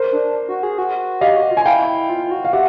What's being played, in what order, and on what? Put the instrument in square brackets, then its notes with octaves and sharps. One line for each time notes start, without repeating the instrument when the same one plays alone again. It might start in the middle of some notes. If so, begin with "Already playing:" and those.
Already playing: [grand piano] A#4 C5
[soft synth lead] D4
F#4
G#4
F#4
[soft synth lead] G4 [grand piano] D#5 F5
[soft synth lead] F#4
F4
[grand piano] G#5
[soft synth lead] E4 [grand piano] F5 G5
[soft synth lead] F4
F#4
[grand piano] F5
[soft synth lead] G4 [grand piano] E5 F#5